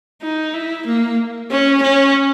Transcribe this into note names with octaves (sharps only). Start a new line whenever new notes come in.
D#4
E4
A#3
C#4
C#4